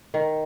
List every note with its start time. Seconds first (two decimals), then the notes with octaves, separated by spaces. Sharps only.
0.14 D#3